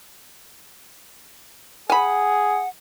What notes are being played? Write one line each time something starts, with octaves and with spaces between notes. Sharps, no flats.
G#4 F#5 G#5 B5